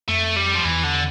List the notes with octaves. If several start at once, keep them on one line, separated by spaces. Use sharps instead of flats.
F2 A3
G3
F3
E2 E3
D3